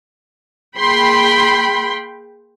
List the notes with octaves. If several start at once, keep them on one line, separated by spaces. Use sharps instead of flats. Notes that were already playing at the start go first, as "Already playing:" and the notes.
A#3 G#4 G5 B5 C6